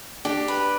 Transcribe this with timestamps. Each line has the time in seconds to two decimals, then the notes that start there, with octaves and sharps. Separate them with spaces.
0.25 D4 G4
0.48 B4